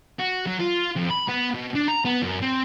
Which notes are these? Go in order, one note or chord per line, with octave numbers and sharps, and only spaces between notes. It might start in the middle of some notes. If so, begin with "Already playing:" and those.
F#4
F#3
F4
F2
B5
B3
B2
D4
A#5
B3
F#2
C4